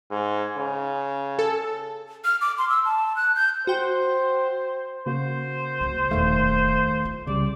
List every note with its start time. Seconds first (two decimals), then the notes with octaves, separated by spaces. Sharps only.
0.11 G#2
0.58 C#3
1.39 A4
2.25 F6
2.41 D6
2.58 C6
2.70 E6
2.85 A5
3.16 F#6
3.36 G6
3.67 F#4 C5 G5
5.06 C#3 A#3 F#4 C5
5.81 C#2 G#3
6.11 D#1 F2 D#3 A3 F5
7.05 F4
7.27 C2 C#3 G3 D5